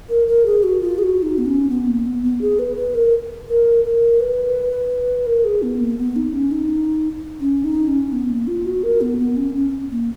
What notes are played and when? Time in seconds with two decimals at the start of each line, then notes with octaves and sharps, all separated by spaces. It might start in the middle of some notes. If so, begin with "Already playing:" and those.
0.09 A#4
0.27 A#4
0.46 G#4
0.63 F#4
0.81 F4
0.98 G#4
1.03 F#4
1.22 D#4
1.38 B3
1.46 C#4
1.70 B3
1.88 A#3
2.06 B3
2.24 B3
2.41 G#4
2.59 B4
2.77 B4
2.95 A#4
3.49 A#4
3.84 A#4
4.20 B4
5.26 A#4
5.45 G#4
5.62 B3
5.80 A#3
5.98 B3
6.16 D#4
6.34 C#4
6.51 D#4
7.40 C#4
7.64 D#4
7.88 C#4
8.12 B3
8.29 A#3
8.47 F4
8.66 F#4
8.83 A#4
9.01 B3
9.19 B3
9.37 C#4
9.55 C#4
9.91 A#3